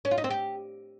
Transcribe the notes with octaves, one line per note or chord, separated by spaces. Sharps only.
C#4
F4
D#4
C4
G4